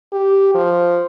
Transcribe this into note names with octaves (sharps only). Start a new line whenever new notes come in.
G4
F3